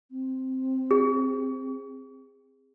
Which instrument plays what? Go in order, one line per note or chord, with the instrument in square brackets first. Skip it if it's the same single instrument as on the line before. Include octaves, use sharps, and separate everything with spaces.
[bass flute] C4
[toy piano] G#4